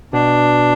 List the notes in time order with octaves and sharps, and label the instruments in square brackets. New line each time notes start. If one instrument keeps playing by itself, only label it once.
[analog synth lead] B2 [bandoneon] D4